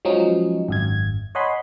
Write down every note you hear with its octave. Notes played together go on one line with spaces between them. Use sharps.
F3 F#3 G#3 C#4 D#4
G#1 F#2 G#6
C#5 D#5 F#5 G#5 B5 C6